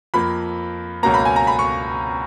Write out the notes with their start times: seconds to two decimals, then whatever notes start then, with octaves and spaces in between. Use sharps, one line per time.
0.14 F2 F3 A#3 B5
1.03 C#2 B2 F#3 A#3 A#5
1.14 B5
1.25 G#5
1.36 A#5
1.47 B5
1.59 C#6